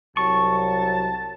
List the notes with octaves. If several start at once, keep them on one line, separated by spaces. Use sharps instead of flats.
C2 F#3 A5 C#6